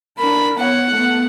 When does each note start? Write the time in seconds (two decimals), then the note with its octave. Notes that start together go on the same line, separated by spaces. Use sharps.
0.18 D4 A#4 B5
0.58 B3 C#5 F#5
0.91 A3 B3